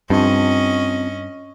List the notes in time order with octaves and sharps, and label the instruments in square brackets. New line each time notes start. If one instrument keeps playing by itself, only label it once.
[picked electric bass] G2 [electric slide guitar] C4 F4 A5 [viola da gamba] C#4 D#5